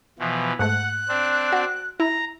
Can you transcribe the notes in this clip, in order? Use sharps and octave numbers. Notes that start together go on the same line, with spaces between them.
B2 E3 F3
G#2 A3 F#5 F#6
C4 D4
F#4
E4 A#5